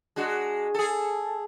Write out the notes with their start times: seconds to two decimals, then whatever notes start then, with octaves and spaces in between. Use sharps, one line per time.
0.16 G#3 D4 F#4
0.74 G#4 A4